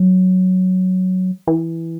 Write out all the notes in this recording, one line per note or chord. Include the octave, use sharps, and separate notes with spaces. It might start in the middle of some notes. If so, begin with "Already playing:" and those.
Already playing: F#3
E3